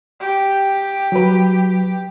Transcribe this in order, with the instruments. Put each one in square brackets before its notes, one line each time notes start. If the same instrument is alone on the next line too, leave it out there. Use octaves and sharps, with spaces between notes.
[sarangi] G4
[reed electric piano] F#3 B4